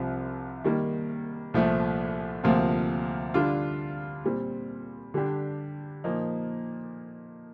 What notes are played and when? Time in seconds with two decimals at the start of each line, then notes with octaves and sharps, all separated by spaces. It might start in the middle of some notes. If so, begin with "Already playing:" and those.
Already playing: C2 C3 F3 C4 F4
0.64 D#3 G3 A#3
1.54 C2 A#2 F3 A3
2.43 D2 C3 F3 A#3 F4
3.34 D3 G3 D4 F4
4.24 A#2 G3 C4
5.14 D3 G3 D4 G4
6.04 A#2 F3 A#3 D#4